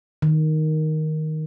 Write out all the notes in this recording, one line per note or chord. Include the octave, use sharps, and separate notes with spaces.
D#3